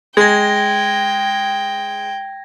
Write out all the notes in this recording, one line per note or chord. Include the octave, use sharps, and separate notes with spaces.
G#3 G5 G#6 A#6